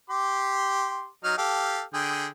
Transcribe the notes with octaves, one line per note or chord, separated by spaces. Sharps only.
G4 C6 D6
F#3 D#4 F6
G4 A4 F5
D3 G#4 G5